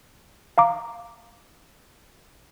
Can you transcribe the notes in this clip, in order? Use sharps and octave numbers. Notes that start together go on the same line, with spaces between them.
F5 A#5 D6